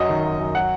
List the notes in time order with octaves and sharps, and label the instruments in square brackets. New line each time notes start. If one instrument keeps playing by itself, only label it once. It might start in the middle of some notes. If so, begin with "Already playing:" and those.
Already playing: [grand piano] F#2 F#3 D#5
D#3
F#2
F#2
F#3 F#5